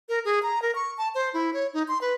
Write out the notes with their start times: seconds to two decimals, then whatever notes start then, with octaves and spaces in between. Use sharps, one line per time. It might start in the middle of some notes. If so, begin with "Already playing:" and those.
0.09 A#4
0.25 G#4
0.42 A#5
0.62 A#4
0.75 C#6
0.98 A5
1.15 C5
1.34 E4
1.53 C#5
1.73 D#4
1.88 C6
2.01 B4